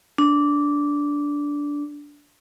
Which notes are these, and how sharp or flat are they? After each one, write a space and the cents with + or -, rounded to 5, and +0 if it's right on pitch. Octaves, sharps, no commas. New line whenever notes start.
D4 -15